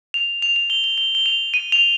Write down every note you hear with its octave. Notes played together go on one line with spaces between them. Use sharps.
F7
F7
F7
G7
G7
G7
G7
F7
D#7
F7